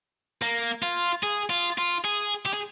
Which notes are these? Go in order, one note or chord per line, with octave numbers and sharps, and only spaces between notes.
A#3
F4
G#4
F4
F4
G#4
G4
G#4